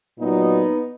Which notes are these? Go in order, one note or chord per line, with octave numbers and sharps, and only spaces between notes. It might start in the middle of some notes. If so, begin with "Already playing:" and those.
A#2 F#3 B3 D#4